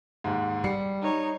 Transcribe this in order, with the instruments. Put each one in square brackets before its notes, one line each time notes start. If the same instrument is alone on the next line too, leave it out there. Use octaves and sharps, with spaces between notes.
[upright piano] D#2 G#2
[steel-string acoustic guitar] G3 [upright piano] C7 C#7
[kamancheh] D#4 C#5